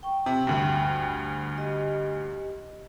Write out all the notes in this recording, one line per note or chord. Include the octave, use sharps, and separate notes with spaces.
G5 C#6
C3
D2 G2
G4 D#5